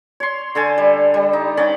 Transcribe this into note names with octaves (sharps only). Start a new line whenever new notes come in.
C#5 C6
D3 A4 G#5
G3
G3
D#4
D#3 C#4 D5